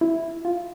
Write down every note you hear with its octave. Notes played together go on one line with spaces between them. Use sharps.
E4
F4